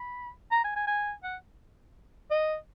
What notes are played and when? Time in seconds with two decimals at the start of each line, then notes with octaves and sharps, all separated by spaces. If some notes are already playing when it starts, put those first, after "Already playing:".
Already playing: B5
0.51 A#5
0.64 G#5
0.76 G#5
0.87 G#5
1.23 F#5
2.31 D#5